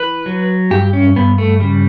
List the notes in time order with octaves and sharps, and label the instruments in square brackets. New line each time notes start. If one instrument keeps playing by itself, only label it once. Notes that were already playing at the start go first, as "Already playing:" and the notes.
Already playing: [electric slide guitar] E3 B4
F#3
G2 G4
C#4
G2 B3
A3
C#3 G3